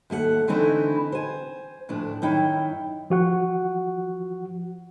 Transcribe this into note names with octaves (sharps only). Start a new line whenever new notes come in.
D#2 A3 G4 F#5
D3 E3 A3 C4 D#4 E4
C5 G#5
D2 A2 F3 D4
F#2 D#3 D#4 E4 G5
F3 F#4 F#5